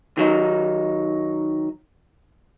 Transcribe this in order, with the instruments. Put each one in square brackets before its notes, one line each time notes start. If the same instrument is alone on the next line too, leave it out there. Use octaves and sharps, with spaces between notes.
[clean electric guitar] D#3 F#3 D#4